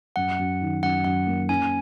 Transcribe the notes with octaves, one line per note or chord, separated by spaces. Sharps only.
F#2 F#5
F#2
D#3
F#2 F#5
F#2 F#5
A#3
C#4 G#5